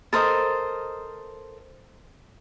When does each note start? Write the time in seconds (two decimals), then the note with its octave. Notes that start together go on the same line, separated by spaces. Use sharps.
0.13 A4 A#4 C5 D#5